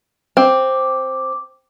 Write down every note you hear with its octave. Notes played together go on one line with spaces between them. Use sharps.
C4 D6